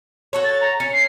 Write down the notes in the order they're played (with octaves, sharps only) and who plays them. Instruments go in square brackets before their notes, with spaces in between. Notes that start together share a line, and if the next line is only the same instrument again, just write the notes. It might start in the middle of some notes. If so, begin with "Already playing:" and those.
[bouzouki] F#4 A4 C#5
[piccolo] A6
A#5
[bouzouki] C#4 [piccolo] C#7
[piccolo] C7